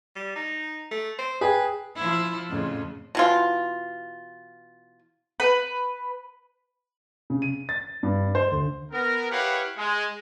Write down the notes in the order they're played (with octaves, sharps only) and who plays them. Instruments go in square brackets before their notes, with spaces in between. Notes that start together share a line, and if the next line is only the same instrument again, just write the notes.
[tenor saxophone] G3
D#4
A3
C5
[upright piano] G#4 G5 G#5 [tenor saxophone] B4
[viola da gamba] F3 E4
F2 A2 C#3
[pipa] B2 E3 F4
[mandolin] B4
[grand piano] C#3
D#7
A6
G2
C5
D2
[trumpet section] B3 A#4
E4 G4 B4 C#5 F5 F#5
G#3